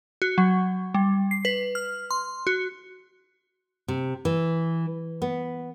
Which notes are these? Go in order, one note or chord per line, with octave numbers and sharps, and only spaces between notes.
F#4
F#3
G3
C7
B4
F6
C6
F#4
C3
E3
B3